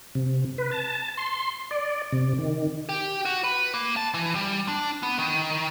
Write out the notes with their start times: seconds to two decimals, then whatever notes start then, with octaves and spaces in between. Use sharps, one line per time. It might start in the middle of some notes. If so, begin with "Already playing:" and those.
0.15 C3
0.58 B4
0.71 A5
1.17 C6
1.71 D5
2.12 C3
2.38 D#3
2.89 G4
3.25 F#4
3.44 B4
3.74 A#3
3.96 A5
4.14 E3
4.35 G3
4.68 D4
5.03 B3
5.18 D#3